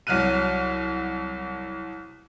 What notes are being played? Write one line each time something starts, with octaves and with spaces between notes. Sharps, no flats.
C2 F#3 F6 F#6 D#7